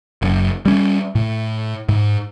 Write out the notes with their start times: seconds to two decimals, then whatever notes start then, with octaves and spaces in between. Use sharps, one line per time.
0.22 F#1 F#2
0.65 G3 C#4
1.15 A2
1.89 G#2